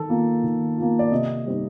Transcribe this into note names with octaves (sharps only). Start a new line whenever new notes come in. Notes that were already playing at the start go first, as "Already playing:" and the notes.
Already playing: D#3 A4
A#3 F4
D#3
A#3 F4
D5
C3 D#5
G3 C4 D#4